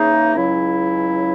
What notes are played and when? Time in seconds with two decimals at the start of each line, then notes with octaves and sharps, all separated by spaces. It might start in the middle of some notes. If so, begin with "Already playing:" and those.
Already playing: C#3 E3 A#3 D#4 G#4
0.35 C#2 C#3 F#3 C#4 E4